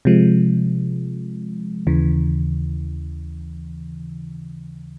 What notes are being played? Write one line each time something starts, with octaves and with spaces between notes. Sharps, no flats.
C3 F3 G#3
D#2 C#3 E3